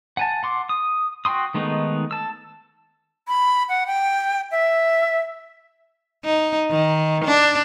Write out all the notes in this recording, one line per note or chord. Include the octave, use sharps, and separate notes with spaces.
F#5 G#5 A5
F#5 C6 D6
D#6
F#4 G5 C6 D#6
D#3 G#3 A3 B3 D#4
A5 E6
B5
F#5
G5
E5
D#4
D#3
D4